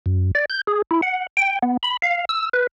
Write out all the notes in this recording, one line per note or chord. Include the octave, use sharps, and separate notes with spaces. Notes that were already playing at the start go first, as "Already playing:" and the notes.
F#2
D5
G6
G#4
E4
F#5
G5
B3
B5
F5
E6
B4